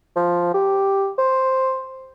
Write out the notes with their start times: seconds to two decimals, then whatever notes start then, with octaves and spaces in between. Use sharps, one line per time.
0.16 F3
0.54 G4
1.18 C5